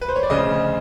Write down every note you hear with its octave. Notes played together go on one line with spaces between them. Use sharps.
B4
C5
C#5
D5
D2 C#3 F3 D#5